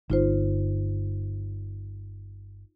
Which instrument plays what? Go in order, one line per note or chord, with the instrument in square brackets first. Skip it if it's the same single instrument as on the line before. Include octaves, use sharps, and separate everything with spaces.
[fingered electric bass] G1 [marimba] D#4 F4 C5